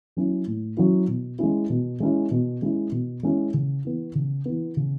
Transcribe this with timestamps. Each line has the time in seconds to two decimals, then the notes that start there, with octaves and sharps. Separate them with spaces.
0.17 F#3 C#4 E4
0.47 A2
0.77 F#3 C#4 E4
1.08 B2
1.39 G#3 C#4 E4
1.70 B2
2.00 G#3 C#4 E4
2.31 B2
2.62 G#3 C#4 E4
2.92 B2
3.23 G#3 C#4 E4
3.54 C#3
3.84 E3 B3
4.15 C#3
4.46 E3 B3
4.77 C#3